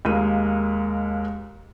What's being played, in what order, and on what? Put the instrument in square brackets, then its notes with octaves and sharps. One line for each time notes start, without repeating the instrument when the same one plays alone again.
[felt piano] D#2 G#3 A#3 D#7